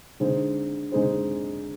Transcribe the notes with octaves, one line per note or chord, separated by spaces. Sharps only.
D3 G#3 D#4 G#4 C5
D3 G#3 D#4 G#4 C5